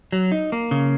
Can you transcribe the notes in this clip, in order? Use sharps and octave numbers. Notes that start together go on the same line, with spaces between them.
F#3
D#4
A#3
C#3